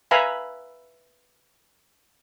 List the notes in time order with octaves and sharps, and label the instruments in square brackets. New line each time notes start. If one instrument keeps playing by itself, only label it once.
[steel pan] B4 E5 F5 G#5 A#5 B5